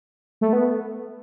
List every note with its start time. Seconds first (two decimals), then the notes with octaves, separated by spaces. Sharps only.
0.41 A3
0.53 B3